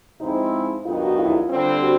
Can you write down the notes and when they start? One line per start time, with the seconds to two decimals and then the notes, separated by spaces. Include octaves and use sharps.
0.19 G#2 F3 G#3 C4 D#4 E4
0.84 G2 D#3 F#3 B3 D#4 F4
1.01 F#4
1.18 F4
1.25 E4
1.32 F4
1.50 D3 G3 C4
1.82 F#4